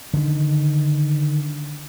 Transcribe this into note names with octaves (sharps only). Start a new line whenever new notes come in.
D3 D#3